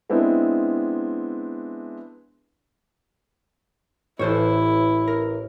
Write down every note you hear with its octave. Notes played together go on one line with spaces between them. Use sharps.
G#3 B3 C4 D4 E4
A1 A2 E3 E4 A4 C5 C#5
A#4